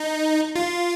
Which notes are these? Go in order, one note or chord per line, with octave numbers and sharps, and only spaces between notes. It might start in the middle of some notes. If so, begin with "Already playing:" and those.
Already playing: D#4
F4